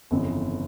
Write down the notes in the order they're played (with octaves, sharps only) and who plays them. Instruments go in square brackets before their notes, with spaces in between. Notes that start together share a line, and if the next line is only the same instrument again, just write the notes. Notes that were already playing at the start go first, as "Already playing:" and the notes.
[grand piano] G1 F2 C#3 E3